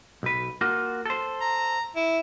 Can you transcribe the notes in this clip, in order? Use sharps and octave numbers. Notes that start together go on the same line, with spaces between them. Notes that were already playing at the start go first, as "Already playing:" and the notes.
B1 B4
A#3 F4 F#4
A4 C5
A#5
E4